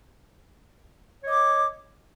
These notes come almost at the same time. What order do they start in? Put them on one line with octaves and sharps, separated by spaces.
C#5 D#5 D6